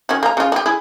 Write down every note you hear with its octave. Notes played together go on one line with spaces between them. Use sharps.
D#3 C#4 F#4
A#3 A#5
C#3 F4
F#4 G4
E4 G#4